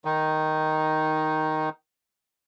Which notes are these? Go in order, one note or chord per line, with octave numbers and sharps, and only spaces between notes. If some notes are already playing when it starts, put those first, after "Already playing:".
D#3 D#4